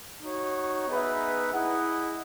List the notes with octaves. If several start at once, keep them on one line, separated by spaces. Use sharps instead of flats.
D#4 F#4 C#5
B3 D#4 G#4 B4 E5
E4 G#4 D#5 F#5